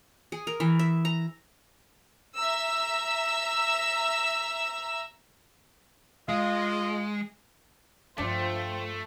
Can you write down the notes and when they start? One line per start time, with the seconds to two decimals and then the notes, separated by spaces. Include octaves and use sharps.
0.32 G#4
0.47 A#4
0.60 E3
0.79 E5
1.05 A#5
2.37 E5 A#5 E6
6.29 G#3 F4 D#5
8.18 G2 F3 A3 D4 F4 C5 G5